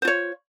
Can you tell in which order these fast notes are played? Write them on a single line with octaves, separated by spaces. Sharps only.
C5 F4 C#5